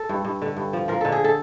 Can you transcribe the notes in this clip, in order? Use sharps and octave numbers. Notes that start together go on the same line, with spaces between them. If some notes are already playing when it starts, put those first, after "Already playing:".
Already playing: A4
G2
G2
D3
G2
F3
F3 A#4
D3 A4
G#4
A4